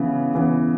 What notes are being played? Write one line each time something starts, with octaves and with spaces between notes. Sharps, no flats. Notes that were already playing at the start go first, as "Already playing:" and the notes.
Already playing: C#3 E3 B3
C#3 E3 B3